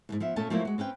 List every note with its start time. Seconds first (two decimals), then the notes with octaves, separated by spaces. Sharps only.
0.09 D#2 G#2
0.20 F3 B3 E5
0.36 A#2 A3 C#4 A4 G#5 A5
0.50 F3 F#3 A3 A#3 E4 F4
0.65 G#3 F#4
0.78 C4 C#4 B4 G5